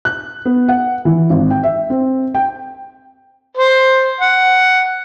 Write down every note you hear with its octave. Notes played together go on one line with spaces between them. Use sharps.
F#6
B3
F#5
E3
G#1
G5
E5
C4
G5
C5
F#5